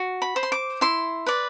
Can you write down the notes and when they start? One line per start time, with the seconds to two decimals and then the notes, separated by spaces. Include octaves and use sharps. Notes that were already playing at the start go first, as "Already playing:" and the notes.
Already playing: F#4
0.22 B5
0.36 C5
0.43 C6
0.52 D6
0.81 E4 C6
1.26 B4 D5